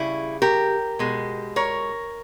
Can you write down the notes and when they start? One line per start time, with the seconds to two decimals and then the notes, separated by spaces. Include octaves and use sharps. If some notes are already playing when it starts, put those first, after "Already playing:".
Already playing: C#3 G3 E4 G#4
0.42 G4 A#4
0.99 B2 G#3
1.56 A#4 C#5